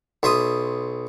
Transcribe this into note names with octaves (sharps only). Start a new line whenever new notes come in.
B1 E5 C6 D#6